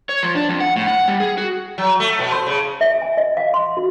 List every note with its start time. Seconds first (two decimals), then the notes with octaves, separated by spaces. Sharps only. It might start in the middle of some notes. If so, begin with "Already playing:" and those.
0.09 C#5
0.23 F3
0.35 D4
0.49 F2
0.60 F#5
0.76 A2
0.87 F#5
1.08 G3
1.20 G#4
1.38 F#4
1.78 F#3
2.00 A3
2.19 B2
2.31 C5
2.46 C#3
2.81 E5
3.02 G#5
3.17 D#5
3.37 F5
3.54 C6
3.77 F#4